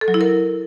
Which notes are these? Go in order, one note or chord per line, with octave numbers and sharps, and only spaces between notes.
A4
F#3
E4
A#4